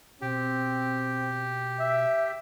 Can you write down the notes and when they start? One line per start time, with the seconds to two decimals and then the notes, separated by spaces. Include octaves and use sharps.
0.22 B2 C4 G4
1.80 E5